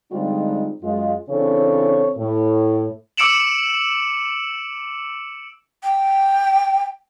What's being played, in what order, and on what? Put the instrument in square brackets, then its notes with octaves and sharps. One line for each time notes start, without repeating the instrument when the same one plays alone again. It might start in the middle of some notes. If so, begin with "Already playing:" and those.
[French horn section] D3 G3 G#3 C4 D#4 F4
F#2 G#3 F4
C#3 E3 C4 D4 A4 C#5
A2
[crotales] D6 E6 C#7 D7 E7 F#7
[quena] G5